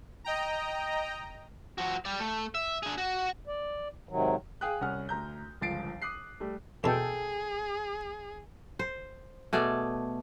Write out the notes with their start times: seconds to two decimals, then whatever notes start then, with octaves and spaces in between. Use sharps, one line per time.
0.24 D#5 G5 A#5
1.78 F3 F#4
2.05 G3 D5
2.20 A3
2.55 E5
2.83 D4 G#4
2.98 F#4
3.47 D5
4.09 G#2 C3 D#3 F#3
4.61 G#4 F5 G5 D#6 F#6
4.81 C2 C#4 F#5 F6
5.09 D2 A#5 G6
5.61 G1 C#2 F3 A6 C7 D7
6.02 D6 D#6 F#6 C7
6.40 G3 A3
6.84 E2 B2 G#4 A4 G5
8.79 C5
9.53 B2 A3 G#4 D5